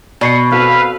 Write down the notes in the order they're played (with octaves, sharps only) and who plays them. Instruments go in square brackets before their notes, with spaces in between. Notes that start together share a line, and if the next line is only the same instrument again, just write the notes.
[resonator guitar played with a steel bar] B2 [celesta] D5 C7 C#7
[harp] C4 F#4 A4 [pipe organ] B4 F5